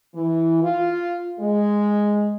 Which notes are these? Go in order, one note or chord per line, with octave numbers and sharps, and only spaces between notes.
E3
F4
G#3